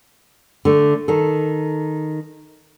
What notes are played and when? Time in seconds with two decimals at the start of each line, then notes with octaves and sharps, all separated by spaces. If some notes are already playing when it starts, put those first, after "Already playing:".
0.65 D3 A3
1.08 D#3 A4